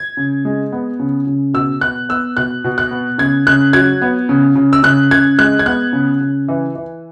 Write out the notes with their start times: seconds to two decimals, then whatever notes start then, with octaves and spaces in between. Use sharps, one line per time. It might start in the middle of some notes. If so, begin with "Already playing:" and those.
Already playing: G#6
0.17 C#3
0.45 G#3
0.73 B3
0.99 C#3
1.27 C#3
1.54 B2 E6
1.81 B3 F#6
2.09 B3 E6
2.37 B2 F#6
2.64 B2
2.78 F#6
2.91 B3
3.18 C#3 G#6
3.47 C#3 F#6
3.73 F#3 G#6
4.02 B3
4.29 C#3
4.55 C#3
4.73 E6
4.83 C#3 F#6
5.11 C#3 G#6
5.38 G#3 F#6
5.59 G#6
5.66 B3 F#6
5.93 C#3
6.21 C#3
6.48 E3
6.75 E3